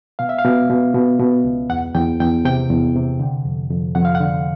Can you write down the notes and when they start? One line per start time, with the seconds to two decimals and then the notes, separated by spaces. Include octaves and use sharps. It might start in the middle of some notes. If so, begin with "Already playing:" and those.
0.19 B2 F5
0.29 E5
0.38 F5
0.45 B2
0.70 B2
0.95 B2
1.19 B2
1.44 C#2
1.69 E2 F#5
1.95 E2 G5
2.20 E2 G5
2.45 C3 G5
2.70 E2
2.95 C3
3.19 D3
3.45 F2
3.70 F2
3.95 F2 F#5
4.05 F5
4.15 F#5
4.20 D3